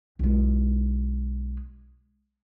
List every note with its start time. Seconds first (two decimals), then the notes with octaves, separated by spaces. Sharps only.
0.19 B1 G#3